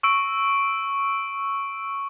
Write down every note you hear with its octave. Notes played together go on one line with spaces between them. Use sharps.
C#6 E6 D7